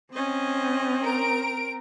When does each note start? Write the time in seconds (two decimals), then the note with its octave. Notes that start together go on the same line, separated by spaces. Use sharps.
0.14 C4 C#4 D#5
1.02 A#4 A#5 D7